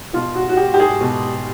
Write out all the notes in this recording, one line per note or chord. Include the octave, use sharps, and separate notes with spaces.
B2 F4
F#4
F#4
G4
G4
G#4
B2